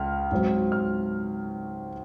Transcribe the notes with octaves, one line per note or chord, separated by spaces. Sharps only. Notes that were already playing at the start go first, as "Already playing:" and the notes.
Already playing: C#2 F6
G#2 F#3 C4
F6